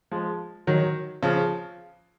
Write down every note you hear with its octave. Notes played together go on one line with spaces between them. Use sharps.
F3 G#3
D#3 F#3
C#3 F3